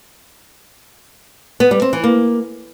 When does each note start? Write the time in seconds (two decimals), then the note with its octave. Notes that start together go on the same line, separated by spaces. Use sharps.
1.60 B3
1.71 G3
1.82 C4
1.93 E3
2.04 A#3